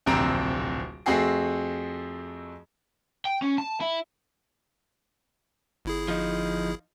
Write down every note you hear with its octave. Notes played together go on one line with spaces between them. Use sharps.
D1 A#1 C3 C4 A#5 D7
F2 A3 C4 F#4 G#4 C7
G5
C#4
A5
E4
G1 E4 G#4
F3 D#4